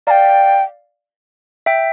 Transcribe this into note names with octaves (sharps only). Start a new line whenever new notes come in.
D5 F5 G5 A#5
E5 G5